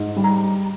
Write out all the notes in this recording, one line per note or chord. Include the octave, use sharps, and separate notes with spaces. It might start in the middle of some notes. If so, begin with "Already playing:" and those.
Already playing: G#2
G3
A#5